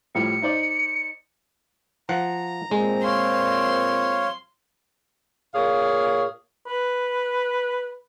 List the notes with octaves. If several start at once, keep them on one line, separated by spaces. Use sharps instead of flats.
A2 F3 G3 C#7
D#4 C5 D5
F3 F#5 A#5
A#2 G#3 C4
C#5 F5 C6
A#2 G#4 C#5 F5
B4